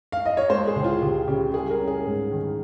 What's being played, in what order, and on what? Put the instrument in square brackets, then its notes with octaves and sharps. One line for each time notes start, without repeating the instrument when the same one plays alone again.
[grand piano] F5
D#5
C#5
G#3 C5
G#4
C#2
F4
C#2 G4
C#3 G4
G3 G#4
A#4
C#4
G#4
G#2
D#3